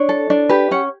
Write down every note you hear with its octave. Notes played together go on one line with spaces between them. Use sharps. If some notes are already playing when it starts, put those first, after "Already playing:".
Already playing: D4 C#5
A4
D4
G4 B4
C#4 F#5